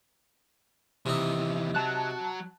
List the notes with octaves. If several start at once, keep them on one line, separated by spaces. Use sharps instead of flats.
D#2 C3 E3 D#4
F#3 F#4 A5 F#6